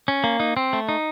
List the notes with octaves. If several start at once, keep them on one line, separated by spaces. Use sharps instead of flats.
C#4
A#3
D#4
C4
A3
D#4